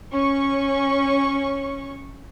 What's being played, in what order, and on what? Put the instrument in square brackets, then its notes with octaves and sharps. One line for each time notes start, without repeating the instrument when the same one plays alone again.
[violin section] C#4 C#6